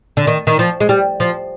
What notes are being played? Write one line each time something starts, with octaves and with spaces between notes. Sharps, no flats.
D3
D#3
D#3
F3
G#3
G3
F3